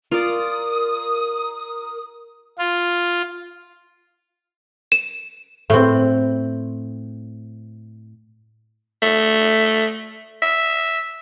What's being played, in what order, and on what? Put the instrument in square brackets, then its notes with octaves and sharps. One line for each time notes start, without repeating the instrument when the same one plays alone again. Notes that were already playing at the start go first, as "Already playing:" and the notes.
[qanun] F4 D5 [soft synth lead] A#4 [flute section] D#6
[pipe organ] F4
[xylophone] E7
[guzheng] A2 C4
[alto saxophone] A3
E5